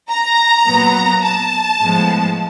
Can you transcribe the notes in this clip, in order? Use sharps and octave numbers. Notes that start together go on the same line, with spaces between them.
A#5
A#2 F#3 B3
A5
A2 F3 G#3 B3